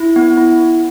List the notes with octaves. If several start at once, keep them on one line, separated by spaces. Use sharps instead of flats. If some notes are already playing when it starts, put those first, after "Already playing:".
Already playing: E4
B3
E4
B3